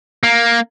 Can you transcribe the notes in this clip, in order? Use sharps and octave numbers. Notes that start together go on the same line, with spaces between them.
A#3